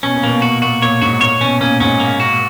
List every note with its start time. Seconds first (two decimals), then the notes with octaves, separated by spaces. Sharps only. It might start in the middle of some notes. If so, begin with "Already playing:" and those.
0.03 B2 C#4
0.14 A#2
0.23 B2 A#3
0.42 F#4
0.62 A#2 F#4
0.82 A#2 C#5
1.01 G#2 F#4
1.21 A#2 C#5
1.41 B2 C#4
1.61 A#2 C#4
1.80 G#2 C#4
2.00 A#3
2.20 F#4